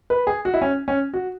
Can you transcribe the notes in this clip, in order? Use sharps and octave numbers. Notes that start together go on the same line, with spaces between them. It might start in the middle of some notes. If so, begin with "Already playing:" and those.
B4
G#4
F#4
E4
C#4
C#4
F#4